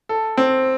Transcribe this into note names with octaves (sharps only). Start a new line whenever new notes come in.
A4
C4